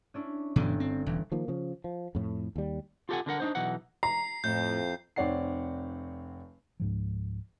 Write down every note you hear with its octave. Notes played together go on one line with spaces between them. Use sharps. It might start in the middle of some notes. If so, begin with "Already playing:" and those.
C#4 D4 E4
G1 B2 E3 F#3
C4
E1 E3
D#3 F3 A#3
C#3 F3
F3
F2 A2
D#2 G3
F4 G4 A4 F5 F#5 G#5
D3 D4 A#4 F#5
D4 D#4 C5
B1 B2 E3 D#4 F#5
A#5 C7
F2 A2 G6
F1 C4 C#5 D5 F#5 C7
C#2 G#2 F3